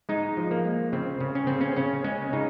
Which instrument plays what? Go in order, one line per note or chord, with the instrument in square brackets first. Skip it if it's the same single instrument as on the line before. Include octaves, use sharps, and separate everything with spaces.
[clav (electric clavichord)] G#3 D#4
F3
A#3
G#3
C#3 C4
C#3
C#4
C#3 C4
C#4
C#3 C#4
G#3 C#4
C#3 D#4